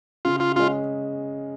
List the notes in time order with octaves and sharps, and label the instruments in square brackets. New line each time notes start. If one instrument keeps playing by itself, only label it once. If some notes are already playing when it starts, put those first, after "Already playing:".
[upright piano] C#3 [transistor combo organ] F4
[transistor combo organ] F4
[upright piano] G#3 C#4 [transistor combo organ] F4